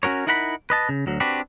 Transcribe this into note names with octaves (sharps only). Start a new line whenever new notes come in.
C#4 F#4 A#4 C#5
D#4 E4 A#4 F#5 A#5 B5
B4 D#5 A5
C#3
D2 F#3
C4 D4 F#4 G4 B4